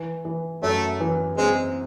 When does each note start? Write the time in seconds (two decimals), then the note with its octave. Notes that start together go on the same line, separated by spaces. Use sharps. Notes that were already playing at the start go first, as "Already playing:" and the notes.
Already playing: E3
0.25 E3
0.63 F#2 A3
1.00 E3
1.38 G#3 C4